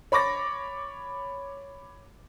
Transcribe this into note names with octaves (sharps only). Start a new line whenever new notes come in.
C#5 B5 C#6 D6 A6 A#6